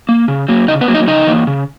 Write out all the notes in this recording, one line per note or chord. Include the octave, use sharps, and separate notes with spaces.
A#3
C#3
F#3 A#3
C#3 D#4 D#5
B3 B4
F#3 A#3
D#4 D#5
C#3 D#4 D#5
E3 A#3
C#3